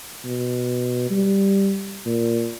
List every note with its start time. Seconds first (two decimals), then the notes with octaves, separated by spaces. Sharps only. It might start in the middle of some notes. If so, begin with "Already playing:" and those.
0.25 B2
1.10 G3
2.06 A#2